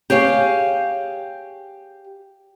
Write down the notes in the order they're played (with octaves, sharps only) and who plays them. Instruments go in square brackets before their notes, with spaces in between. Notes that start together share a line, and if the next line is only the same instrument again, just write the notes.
[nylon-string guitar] G4 G#4 C#5 F5